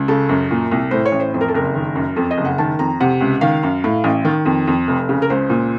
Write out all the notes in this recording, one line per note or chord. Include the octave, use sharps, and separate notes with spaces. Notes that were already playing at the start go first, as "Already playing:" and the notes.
Already playing: C#2
C#3 A4
F#2
A#2
C2
A2 C5
C#5
A1
C5
F2 C5
A#4
A4
F#1 A#4
D#3
F#2
F2 A4
D#5
F#1
F#5
D#3 A5
F2 A#5
C3 F#5
C#2
D#3 F5
F#2
A2
A1
D#3
F2
F2
F1
C#3
A#4
C#2 C5
A#2